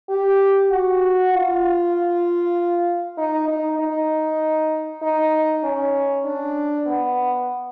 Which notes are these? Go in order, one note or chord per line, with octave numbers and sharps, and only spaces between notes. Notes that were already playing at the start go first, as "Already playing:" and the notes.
G4
F#4
F4
D#4
D#4
D#4
D#4
C#4
D4
B3